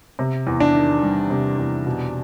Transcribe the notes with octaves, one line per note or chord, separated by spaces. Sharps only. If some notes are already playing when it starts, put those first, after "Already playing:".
C3
E2
D4
D#3
G3
C3
E2
B2